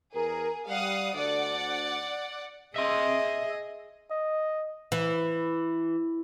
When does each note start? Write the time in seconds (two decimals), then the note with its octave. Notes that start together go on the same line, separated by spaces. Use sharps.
0.14 E2 G#4 A#4
0.68 G3 F5 F#5 D#6
1.13 D2 D3 D5 F#5
2.76 G#4 D#5 E5 C6
4.11 D#5
4.92 E3